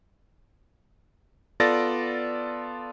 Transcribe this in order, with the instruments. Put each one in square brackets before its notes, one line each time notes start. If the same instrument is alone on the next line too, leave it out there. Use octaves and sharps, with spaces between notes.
[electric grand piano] B3 F4 A4 D5 A6 A#6